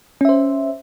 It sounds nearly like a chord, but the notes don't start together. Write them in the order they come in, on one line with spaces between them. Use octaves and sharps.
C#4 E5 C5